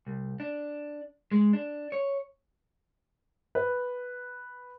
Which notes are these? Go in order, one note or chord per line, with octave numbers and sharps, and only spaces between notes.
C2
D4
G#3
D4
C#5
B4